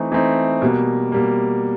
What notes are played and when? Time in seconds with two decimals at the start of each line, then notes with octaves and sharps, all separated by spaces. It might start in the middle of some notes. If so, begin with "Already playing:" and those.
Already playing: E3 A3 C4 D#4
0.12 E3 A3 C4 D#4
0.61 B2 G3 A#3
1.12 B2 G3 A#3